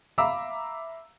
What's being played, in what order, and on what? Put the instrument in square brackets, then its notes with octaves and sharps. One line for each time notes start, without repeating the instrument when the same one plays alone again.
[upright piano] E5 F5 A#5 B5 D6 E6